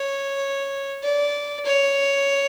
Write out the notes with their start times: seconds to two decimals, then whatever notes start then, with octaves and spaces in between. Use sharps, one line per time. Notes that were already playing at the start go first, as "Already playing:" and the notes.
Already playing: C#5
1.03 D5
1.65 C#5